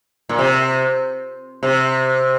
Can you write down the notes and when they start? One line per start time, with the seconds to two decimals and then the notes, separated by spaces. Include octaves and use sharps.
0.29 A#2
0.39 C3
1.63 C3